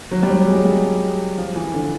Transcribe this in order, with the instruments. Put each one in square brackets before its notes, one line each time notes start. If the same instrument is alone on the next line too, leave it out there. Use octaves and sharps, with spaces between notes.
[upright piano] F#3
G3
F#3
G#3
G3
F3
E3
D3